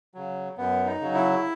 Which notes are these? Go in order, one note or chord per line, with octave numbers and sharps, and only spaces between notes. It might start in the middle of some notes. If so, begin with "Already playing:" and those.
C#3 F#3
F#2 B3
D#4
C#3 F#3
E4